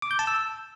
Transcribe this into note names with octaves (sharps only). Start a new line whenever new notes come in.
D6
G6
A5
E6